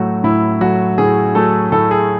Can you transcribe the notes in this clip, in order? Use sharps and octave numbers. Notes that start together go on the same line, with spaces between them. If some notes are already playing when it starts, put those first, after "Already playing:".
Already playing: A2 F#3 A3 F#4
A2 E4
F#3 A3 F#4
A2 G#4
F#3 A3 A4
A2 A4
G#4